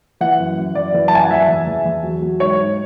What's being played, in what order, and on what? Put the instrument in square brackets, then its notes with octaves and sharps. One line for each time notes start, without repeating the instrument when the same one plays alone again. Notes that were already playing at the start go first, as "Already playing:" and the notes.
[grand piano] E3 F#5
F#2
F#2
F#2 D5
E3
A5
F#2 G#5
F#5
E2 E5
E2
E2
E2
F#3
F#3
G#2 C#5
G#2